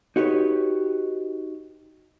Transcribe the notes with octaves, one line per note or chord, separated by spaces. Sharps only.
D#4 F#4 G4 B4 C#5